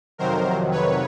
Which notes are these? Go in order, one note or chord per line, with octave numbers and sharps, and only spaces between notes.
F2 C3 D#3 F#3 A#4 C5
B4 C#5